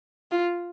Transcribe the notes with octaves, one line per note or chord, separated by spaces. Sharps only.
F4